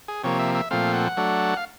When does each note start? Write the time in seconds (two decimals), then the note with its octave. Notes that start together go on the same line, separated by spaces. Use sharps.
0.08 G#4
0.24 C3 F3 A#3 C#5
0.39 E5
0.55 E5
0.71 A#2 F3 A3 C4 F5
0.93 F#5
1.17 F#3 A3 D4
1.57 F5